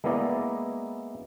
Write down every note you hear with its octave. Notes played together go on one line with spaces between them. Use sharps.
G#3 A#3 B3 E4 D5 D#5